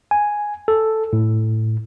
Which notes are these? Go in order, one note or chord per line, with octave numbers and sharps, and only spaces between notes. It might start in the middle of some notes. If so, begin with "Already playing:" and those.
G#5
A4
A2